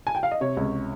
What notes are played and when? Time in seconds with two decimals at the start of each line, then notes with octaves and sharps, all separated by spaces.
0.07 G#5
0.15 G5
0.23 F5
0.32 D#5
0.41 C3 C#5
0.57 C#2